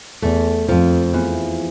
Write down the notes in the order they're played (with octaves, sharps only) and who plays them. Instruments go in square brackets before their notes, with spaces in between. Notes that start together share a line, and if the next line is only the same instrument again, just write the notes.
[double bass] E2 [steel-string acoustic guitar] A3
[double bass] F2 [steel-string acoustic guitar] F3
[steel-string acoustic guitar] E2